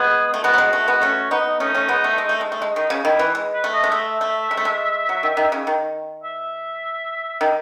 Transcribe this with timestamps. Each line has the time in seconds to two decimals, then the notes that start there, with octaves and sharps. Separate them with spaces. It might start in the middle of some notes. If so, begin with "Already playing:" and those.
Already playing: G#3 B3 G#4
0.34 A3
0.44 G#3 B3 F#4
0.54 F#3
0.58 G#3
0.73 A3
0.88 G#3 B3
1.02 A3 C#4
1.31 B3 D#4
1.60 A3 C#4 D#4
1.75 A3 C#4
1.89 G#3 B3
2.04 A3
2.18 G#3
2.29 A3
2.41 G#3
2.52 A3
2.62 G#3
2.76 D#3 D#4
2.90 C#3
3.05 D#3 E4
3.19 E3
3.35 G#3
3.54 B4
3.64 A3
3.73 D#5
3.84 G#3
3.92 A3 E5
4.21 A3
4.51 G#3
4.57 A3
4.65 G#3
5.09 F#3
5.23 D#3
5.37 D#3
5.52 C#3
5.67 D#3
6.24 E5
7.41 D#3